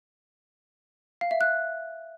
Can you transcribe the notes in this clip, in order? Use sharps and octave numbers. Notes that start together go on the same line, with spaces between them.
F5
E5
F#6